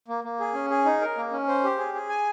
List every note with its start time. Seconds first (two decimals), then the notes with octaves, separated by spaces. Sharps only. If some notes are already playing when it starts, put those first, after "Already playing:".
0.08 A#3
0.24 A#3
0.40 G#4
0.54 C#4
0.70 G#4
0.85 D#4
1.01 A#4
1.17 A#3
1.32 C#4
1.48 C5
1.64 G4
1.78 G#4
1.94 G#4
2.09 G#5